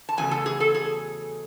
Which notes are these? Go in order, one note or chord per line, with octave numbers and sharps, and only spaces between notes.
A5
E2 C#3 F#3 A3 G#5
A4
G#4
A4
G#4